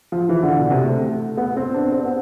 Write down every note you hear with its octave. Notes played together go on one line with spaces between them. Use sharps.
F3
E3
D3
B2
C3
A3
B3
C4
D4
C4
B3